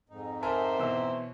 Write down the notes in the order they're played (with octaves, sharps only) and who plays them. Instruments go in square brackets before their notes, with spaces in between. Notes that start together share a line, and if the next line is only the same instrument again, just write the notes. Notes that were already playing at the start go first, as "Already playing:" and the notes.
[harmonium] F2 G#2 D#4
[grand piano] A#4 G#5 A5 [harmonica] C5 E5
[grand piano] B2 E3 E6
[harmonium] C#5